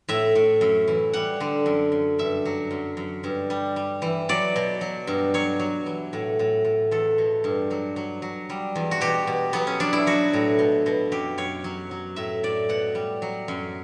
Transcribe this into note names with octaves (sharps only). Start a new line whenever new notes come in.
A2 E5
A2
F#2
E3
G3 F#5
D3
F#2
F#2
G2 E5
F#3
F#2
F#2
G2
G3
G3
E3
F#3 D5
B2
F#3
G2
F#3 C#5
F#3
E3
A2
A2
A2
E2 A4
B2
G2
F#3
F#3
F#3
G3
E2
F#4
B2 G4
B2
F#3 B3
C#4
F#3 D4
E4
F#3 F#4
A2
B2
B2
F#2 G4
F#2 C#5
F#3
F#3
A2 E5
A2 D5
B2 F#5
G3
F#3
F#2